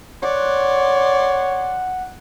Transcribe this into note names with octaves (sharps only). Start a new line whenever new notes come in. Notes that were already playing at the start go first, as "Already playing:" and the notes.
C#5 D5 F#5 C6